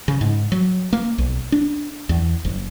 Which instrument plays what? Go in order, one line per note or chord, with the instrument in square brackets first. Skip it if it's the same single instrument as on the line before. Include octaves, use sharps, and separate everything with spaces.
[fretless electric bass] C#3
G#2
F#3
A#3
B1
D4
E2
F#1